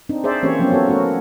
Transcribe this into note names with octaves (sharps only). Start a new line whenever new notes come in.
C4 D4 D#4
G#4 C5 D5 E5
E3 A#3 C4 C#4 G4 C#5
F3 F#3 A#3 B3 C#4
B3 F#4 A4 C#5
A3 C#4 F#4 A#4